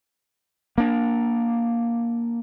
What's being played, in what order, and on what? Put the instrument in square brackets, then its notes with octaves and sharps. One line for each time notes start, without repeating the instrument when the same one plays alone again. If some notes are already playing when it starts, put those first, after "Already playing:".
[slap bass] A#3 D4